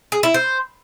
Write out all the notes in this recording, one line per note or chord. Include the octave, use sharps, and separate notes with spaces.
G#4
E4
C5